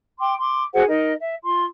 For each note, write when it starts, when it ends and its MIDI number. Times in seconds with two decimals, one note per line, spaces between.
0.19 0.33 79
0.19 0.33 84
0.19 0.33 86
0.38 0.63 84
0.38 0.63 86
0.73 0.83 66
0.73 0.83 68
0.73 0.83 72
0.73 0.83 78
0.87 1.12 63
0.87 1.12 70
0.87 1.12 75
1.19 1.35 76
1.43 1.64 65
1.43 1.64 84